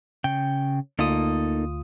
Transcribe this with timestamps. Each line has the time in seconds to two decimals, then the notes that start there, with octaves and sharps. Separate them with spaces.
0.24 C#3 G5
0.99 D2 A#3 D#4 F4 A4 D#6